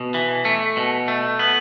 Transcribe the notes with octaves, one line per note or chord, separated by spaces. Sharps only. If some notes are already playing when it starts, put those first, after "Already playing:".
Already playing: B2
E3
A3
B2
A3
B3